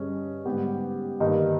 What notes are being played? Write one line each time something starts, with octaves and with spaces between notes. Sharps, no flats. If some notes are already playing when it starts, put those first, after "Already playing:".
Already playing: G2 G3 C#4 G#4 D#5
G#2 G3 B3 G4
G2 D#3 G3 A#3 D#4